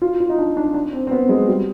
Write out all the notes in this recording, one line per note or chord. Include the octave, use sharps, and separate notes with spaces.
F4
F4
D#4
D4
D4
D4
C4
C4
B3
G#3
G3